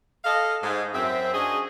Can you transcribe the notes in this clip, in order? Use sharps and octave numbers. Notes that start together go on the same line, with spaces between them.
A4 D#5 F5
G#2
F#2 C4 E5
C#4 D4 F#4 G#4 D#5